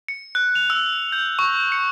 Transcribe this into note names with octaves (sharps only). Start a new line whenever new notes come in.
C#7
F#6
F7
E6
G6
C#6
C#7